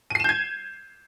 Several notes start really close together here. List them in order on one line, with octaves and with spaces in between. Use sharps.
D#7 C7 E7 G6 G#6